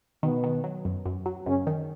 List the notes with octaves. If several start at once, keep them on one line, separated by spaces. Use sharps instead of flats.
B2 D#3 B3
D#3
F#3
F#2
F#2
F#3
F#2 C#3 C#4
D#3